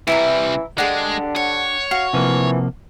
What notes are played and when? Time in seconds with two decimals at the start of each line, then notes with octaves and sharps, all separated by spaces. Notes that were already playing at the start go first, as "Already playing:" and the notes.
0.07 C3 E3 G3 E4 E5 A#5
0.78 D3 G#3 D4 G4 G#4 F#5
1.36 C#5 F#5
1.91 F#4 F5
2.13 C3 E3 F3 A#3